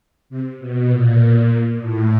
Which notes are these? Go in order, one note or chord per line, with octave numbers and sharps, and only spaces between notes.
C3
B2
A#2
A#2
A2